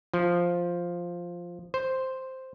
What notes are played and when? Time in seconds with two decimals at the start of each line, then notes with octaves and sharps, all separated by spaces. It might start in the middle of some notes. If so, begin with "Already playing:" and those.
0.14 F3
1.74 C5